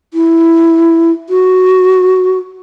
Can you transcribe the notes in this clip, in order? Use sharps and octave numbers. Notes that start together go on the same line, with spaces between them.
E4
F#4